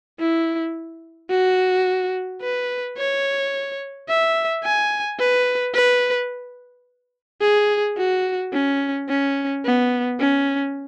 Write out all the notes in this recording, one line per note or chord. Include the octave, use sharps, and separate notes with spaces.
E4
F#4
B4
C#5
E5
G#5
B4
B4
G#4
F#4
C#4
C#4
B3
C#4